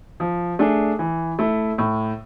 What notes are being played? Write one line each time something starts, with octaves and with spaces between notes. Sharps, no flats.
F3
A3 D4 G#4
E3
A3 E4
A2